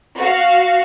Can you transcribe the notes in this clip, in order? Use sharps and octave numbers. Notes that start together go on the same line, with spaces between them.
F#4 F5